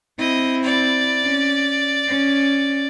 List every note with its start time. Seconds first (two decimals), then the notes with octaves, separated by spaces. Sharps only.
0.18 C4 E4 D#5
0.63 D5
1.23 C#4
2.07 C#4